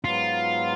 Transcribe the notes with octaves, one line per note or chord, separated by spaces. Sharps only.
G#2 F#3 B3 F4